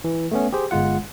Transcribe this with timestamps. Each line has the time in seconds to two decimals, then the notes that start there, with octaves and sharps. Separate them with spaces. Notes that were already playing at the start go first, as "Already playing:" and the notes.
0.04 E3
0.31 A3 B3 C#4
0.53 G4 G#4 C5
0.71 G1 G#3 F4 F#5